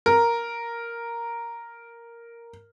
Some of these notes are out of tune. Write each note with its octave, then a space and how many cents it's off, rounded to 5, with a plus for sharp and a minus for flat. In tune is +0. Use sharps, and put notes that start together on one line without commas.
A#4 +0